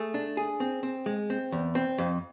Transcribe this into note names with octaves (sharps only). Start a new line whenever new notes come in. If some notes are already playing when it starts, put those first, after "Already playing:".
Already playing: A3 G#4
D4
G#4
C4
C4
G#3
C4
E2
C4
F2